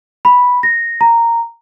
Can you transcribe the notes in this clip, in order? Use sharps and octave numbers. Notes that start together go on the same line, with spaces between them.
B5
A#6
A#5